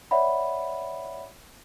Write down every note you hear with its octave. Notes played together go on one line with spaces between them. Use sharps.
C#5 D5 E5 F#5 B5